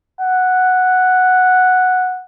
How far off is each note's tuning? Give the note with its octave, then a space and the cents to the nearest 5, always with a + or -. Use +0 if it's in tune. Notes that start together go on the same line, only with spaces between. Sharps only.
F#5 -5